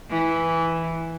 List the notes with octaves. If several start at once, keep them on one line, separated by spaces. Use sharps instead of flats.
E3